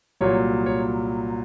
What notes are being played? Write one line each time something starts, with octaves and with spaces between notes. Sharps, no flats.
C2 A#2 F#3 C#5
C#5